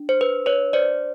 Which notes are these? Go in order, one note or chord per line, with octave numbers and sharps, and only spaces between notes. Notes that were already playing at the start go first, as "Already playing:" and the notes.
Already playing: D4
C5
B4
B4 C#5
C5 D5